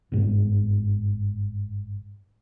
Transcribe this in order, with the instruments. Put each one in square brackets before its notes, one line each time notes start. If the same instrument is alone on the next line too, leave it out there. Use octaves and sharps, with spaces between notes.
[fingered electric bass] G1 G#2